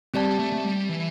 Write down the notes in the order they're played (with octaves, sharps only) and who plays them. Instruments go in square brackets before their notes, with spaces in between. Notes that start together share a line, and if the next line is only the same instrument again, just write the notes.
[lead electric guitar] G3 [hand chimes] C4 G4 D5 A5
[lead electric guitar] A3
A3
G3
E3